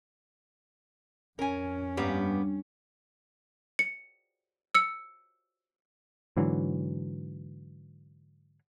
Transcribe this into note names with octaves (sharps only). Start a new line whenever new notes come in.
F2 C#4 A#4 G#5
G2 A#3 B3 G4
C#7
E6 C#7
G#2 D3 E3 F#3